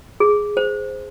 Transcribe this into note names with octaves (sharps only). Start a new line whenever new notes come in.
G#4
C5